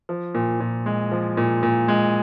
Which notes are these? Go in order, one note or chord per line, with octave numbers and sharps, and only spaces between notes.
F3
A#2
A#2
G#3
F3
A#2
A#2
G#3